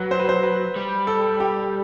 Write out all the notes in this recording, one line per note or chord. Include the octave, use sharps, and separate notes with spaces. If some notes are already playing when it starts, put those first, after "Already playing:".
Already playing: F#3 B4
C5
B4
C5
B4
G3
A4
G4